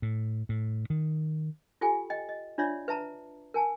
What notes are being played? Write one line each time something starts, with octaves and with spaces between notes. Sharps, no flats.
A2
A2
D#3
F4 G4 A4 G5 G#5
D#5 G5
D#5
D4 F4 C#5 D5 E5
B4 E5 A5 A#5
A#4 G#5 A5